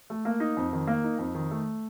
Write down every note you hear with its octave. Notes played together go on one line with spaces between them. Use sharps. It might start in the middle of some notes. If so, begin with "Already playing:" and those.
A3
A#3
D#4
F2
D#3
A#3
D#4
F2
D#3
A3